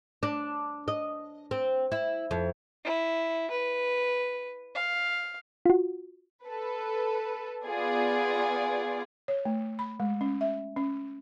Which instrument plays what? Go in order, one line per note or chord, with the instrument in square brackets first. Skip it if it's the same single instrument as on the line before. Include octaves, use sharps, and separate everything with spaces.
[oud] D4
D#5
C4
E4
F2
[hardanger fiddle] E4
B4
F5
[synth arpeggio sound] F4 F#4
[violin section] A4 B4
B3 F4 G#4 D5
[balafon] C#5
A3
B5
G#3
C#4
E5
C#4